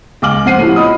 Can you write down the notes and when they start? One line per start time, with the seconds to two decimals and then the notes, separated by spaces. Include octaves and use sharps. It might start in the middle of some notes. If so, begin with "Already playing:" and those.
0.22 C#2 G#5 D6 F6 F#7
0.45 F2 C4 F#5 C7 D#7
0.59 A2 C3 F3
0.76 D#5 B5 D#6